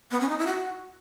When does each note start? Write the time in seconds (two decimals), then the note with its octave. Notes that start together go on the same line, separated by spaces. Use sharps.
0.11 B3
0.21 C#4
0.29 D#4
0.39 E4
0.47 F#4